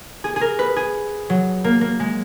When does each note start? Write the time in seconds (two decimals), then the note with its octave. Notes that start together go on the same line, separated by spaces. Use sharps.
0.24 G#4
0.36 G#4
0.41 A#4
0.59 B4
0.76 G#4
1.30 F#3
1.64 A#3
1.81 A#3
2.00 G#3